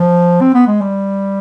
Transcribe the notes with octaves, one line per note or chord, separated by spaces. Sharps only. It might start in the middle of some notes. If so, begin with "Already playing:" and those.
Already playing: F3
C4
B3
G#3
G3